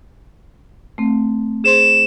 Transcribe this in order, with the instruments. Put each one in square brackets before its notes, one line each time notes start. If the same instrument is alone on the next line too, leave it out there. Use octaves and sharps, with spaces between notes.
[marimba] A3 C4
[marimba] G#4 C5 C6 [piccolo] E7